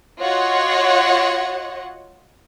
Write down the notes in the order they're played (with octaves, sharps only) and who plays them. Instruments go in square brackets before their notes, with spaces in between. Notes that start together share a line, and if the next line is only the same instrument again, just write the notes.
[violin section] F4 F#4 C#5 D#5 F#5